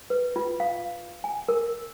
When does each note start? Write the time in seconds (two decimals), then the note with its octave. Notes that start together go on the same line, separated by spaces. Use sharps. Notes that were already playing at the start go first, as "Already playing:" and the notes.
0.10 B4
0.36 F4
0.60 F5
1.24 G#5
1.48 A#4